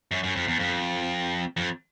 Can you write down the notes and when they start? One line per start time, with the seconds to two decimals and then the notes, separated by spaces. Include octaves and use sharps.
0.11 F#2
0.23 F#2
0.36 F2
0.47 E2
0.59 F2
1.57 F2